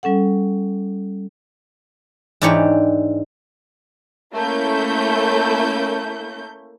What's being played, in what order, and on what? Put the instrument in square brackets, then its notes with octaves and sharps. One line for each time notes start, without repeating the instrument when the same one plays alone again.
[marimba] G3 C#4 A4 F#5
[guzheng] G#2 E3 D4 D#4 G4 C#5
[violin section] A3 A#3 C#4 E4 G6